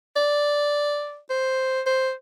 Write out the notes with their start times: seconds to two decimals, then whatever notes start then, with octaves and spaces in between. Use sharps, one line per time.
0.16 D5
1.30 C5
1.87 C5